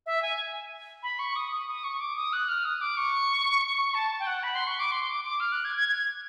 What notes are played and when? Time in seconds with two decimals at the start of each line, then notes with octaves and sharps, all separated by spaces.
0.06 E5
0.22 G#5
1.03 B5
1.19 C#6
1.36 D#6
1.52 D#6
1.68 D#6
1.84 C#6
2.00 D6
2.16 D#6
2.33 F#6
2.49 F6
2.65 D#6
2.81 D6
2.97 C#6
3.94 A5
4.20 G5
4.27 F#5
4.43 B5
4.55 C6
4.67 C#6
4.80 D6
4.92 C6
5.08 D6
5.24 D6
5.40 F6
5.52 F#6
5.65 G#6
5.77 G#6
5.89 G#6